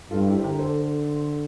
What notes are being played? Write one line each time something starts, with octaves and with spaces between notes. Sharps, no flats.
G2 F4 A4
E4 G4
C5
D3 G4 A#4
A4 C5